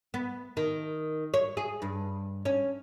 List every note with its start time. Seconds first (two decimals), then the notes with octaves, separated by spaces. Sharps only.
0.14 B3
0.57 D#3
1.34 C#5
1.57 G#4
1.82 G2
2.45 C#4